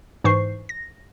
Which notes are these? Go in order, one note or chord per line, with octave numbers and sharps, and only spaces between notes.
G#2 E3 C5 C#6 C7
A#6